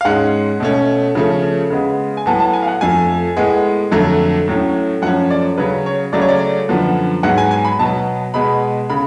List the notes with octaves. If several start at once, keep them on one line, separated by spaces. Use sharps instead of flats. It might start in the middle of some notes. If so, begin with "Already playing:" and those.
F5
G#2 G#3 C#4 F#5
B2 A3 C#4
C#3 F3 A3 C#4
C#3 G#3 B3
G#5
A2 F#3 B3 A5
A5
G#5
F5
F#5
F2 F3 A3 G#5
A2 G#3 B3
F2 D3 F#3 A3
A2 F#3 A3 C#4
F#2 F3 A3 C#4 F#5
D5
C#3 F#3 C#4 B4
C#5
C#3 F#3 A3 C#4 D5
C#5
D5
F#2 D3 F3 B3
G#2 F#3 B3 F#5
G#5
G#5
B5
B2 F#3 B3 A5
B2 G#3 B3 B5
C#3 B5